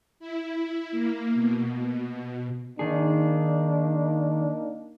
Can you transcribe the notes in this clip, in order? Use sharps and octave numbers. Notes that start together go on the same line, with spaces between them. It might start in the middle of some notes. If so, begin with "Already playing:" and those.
E4
A#3
B2
D#3 A#3 D4 D#4 G#4